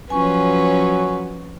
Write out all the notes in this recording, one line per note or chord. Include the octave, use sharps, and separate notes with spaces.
F3 F#3 C#4 B4 G#5 C#6